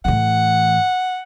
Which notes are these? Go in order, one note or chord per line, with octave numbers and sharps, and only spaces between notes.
A2 E3 F#5